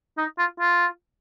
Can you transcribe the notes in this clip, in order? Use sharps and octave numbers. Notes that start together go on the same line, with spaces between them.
D#4
F4
F4